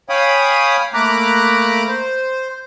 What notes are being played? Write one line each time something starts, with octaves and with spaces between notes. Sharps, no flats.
C#5 F5 G5 G#5 B5 D#6
A3 A#3 A#5 B5 D6 F#6
C5